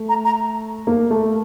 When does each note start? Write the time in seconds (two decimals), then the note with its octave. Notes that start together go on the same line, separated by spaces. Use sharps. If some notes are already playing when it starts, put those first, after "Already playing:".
Already playing: A3
0.09 A#5
0.25 A#5
0.87 A#3
1.10 A3